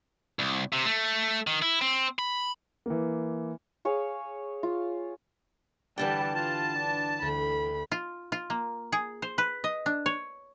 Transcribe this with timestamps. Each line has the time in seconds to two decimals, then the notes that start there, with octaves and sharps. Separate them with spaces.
0.39 C2
0.73 C3
0.86 A3
1.47 D#3
1.62 E4
1.81 C4
2.19 B5
2.86 E3 A#3
3.85 G#4 C#5 F5
4.63 F4
5.98 G2 D3 E3 G3 B4 G5 A5
6.35 F4 A5
6.79 D4
7.22 D2 B5
7.92 F4
8.32 F4
8.50 A#3
8.92 G#4
9.22 C5
9.38 B4
9.64 D#5
9.86 D4
10.06 C#5